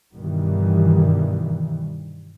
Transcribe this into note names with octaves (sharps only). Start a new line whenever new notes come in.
G1 G2 B2 D#3 E3 G3